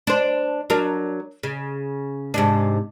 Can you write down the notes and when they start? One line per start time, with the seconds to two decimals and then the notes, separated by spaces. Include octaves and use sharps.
0.07 D4 C5
0.70 F#3 D4 A#4
1.43 C#3
2.34 G#2 C3 D4